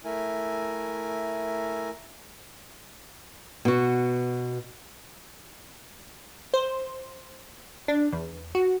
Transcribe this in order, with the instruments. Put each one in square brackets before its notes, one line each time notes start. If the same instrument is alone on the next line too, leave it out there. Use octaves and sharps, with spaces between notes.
[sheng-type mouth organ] A3 E4 A#4 G#5
[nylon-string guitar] B2 F#4
[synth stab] C5
D4
E2
F#4